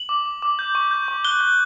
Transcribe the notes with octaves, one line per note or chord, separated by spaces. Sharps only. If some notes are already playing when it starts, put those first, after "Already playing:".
Already playing: F#7
D6
D6
D6
G6
C#6
G6
C#6
F#6 G7
F#6